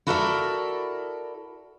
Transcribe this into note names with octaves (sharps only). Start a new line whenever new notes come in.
E4 F#4 A4 A#4 D5 E5